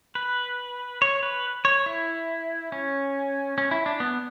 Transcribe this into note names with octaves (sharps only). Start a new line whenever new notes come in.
B4
C#5
B4
C#5
E4
C#4
C#4
E4
D4
B3